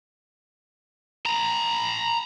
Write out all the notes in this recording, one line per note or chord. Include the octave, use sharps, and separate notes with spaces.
A#5 B5